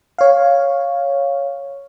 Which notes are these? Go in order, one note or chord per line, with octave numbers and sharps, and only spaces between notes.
C#5 F5